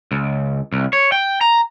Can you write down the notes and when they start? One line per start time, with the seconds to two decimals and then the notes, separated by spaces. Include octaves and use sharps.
0.12 C#2
0.72 C2
0.93 C#5
1.12 G5
1.41 A#5